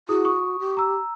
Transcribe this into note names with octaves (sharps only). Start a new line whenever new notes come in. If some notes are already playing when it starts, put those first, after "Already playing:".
E4 F#4 G#4 D#6
C#6 D#6
G4
A#5 E6